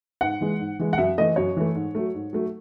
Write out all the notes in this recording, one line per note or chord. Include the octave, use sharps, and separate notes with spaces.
G#2 F#5
E3 G#3
G#2
E3 G#3
F#5
F#2 E5
E3 A3 D#5
F#2 C#5
E3 A3
G#2
F#3 A3
G#2
F#3 A3